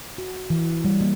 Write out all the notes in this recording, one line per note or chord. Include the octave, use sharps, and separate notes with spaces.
F#4
E3
G3
A#3